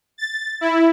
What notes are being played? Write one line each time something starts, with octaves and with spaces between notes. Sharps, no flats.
A6
E4